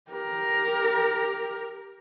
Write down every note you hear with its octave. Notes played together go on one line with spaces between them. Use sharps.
G4 A#4